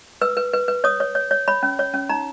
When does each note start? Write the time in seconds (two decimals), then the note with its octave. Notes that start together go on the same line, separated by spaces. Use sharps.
0.21 B4 E6
0.37 B4
0.53 B4
0.68 B4
0.84 C#5 D#6
1.00 C#5
1.15 C#5
1.31 C#5
1.48 C#5 B5
1.63 C#4
1.79 C#5
1.94 C#4
2.09 D#4 A#5